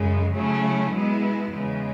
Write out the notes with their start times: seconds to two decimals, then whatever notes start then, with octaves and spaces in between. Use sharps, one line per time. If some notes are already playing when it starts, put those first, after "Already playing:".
Already playing: F#2 C#3 G#3
0.33 C#3 F#3 A3 C#4 E4
0.92 B2 G#3 B3 E4
1.52 E2 C#3 G#3